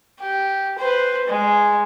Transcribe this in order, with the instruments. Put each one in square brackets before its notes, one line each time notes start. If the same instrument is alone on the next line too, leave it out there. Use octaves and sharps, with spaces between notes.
[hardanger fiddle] G4
B4 C5
G#3